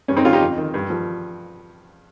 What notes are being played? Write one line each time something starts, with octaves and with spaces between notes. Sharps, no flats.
G2 C#4
C4 D#4
D#3 C#4 F4
D#4 G4
F2
D#3
G2
F3